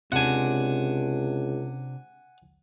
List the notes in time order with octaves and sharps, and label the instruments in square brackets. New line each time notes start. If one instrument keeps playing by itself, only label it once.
[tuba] C#2 [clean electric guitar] C3 D4 [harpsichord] F#5 G#5